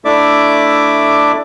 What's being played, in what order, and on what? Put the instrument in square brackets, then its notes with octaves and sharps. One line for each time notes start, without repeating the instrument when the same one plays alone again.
[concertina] A3 D4 E4 D5 E5 D6